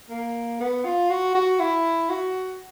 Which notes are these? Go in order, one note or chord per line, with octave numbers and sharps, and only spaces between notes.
A#3
B3
F4
F#4
F#4
E4
F#4